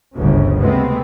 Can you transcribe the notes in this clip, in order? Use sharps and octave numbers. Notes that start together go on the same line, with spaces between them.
G1 D2 C#3
C3 G#3 A3 B3 C4